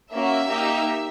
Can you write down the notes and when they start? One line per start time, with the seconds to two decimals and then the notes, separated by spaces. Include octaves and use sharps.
0.12 A#3 C#4 F#4 E5
0.50 A#3 D#4 G4